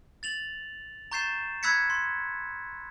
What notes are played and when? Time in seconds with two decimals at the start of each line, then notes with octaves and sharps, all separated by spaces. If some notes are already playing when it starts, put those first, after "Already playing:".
0.23 A6 F7 F#7
1.12 A#5 C#6 G6 A6 C7 E7
1.63 B5 E6 F#6 G#6 B6 C#7
1.90 C6